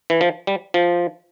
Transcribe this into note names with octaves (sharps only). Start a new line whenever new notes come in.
E3
F3
G3
F3